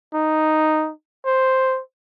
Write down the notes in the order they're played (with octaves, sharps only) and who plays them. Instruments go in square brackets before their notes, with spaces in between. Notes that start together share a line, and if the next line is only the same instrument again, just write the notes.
[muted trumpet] D#4
C5